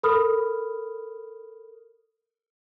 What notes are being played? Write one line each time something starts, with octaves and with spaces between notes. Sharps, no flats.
A4 A#4 B5 D#6 F6